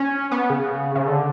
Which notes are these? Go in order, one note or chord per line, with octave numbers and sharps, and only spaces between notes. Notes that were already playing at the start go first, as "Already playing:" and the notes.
Already playing: C#4
B3
C#3
C#3
D3